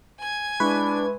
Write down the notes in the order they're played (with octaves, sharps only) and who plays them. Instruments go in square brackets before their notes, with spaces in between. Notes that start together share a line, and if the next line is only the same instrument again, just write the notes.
[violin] G#5 G#6
[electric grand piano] G#3 E4 C#6 [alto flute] D4 [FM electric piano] B4